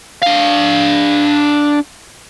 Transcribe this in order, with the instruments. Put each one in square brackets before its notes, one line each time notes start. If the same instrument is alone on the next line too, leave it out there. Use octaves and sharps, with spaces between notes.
[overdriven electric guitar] D4 F5